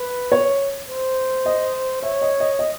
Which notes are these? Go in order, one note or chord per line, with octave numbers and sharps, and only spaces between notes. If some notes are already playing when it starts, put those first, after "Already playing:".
Already playing: B4
C#5
C5
D#5
C#5 E5
D#5
D#5
D#5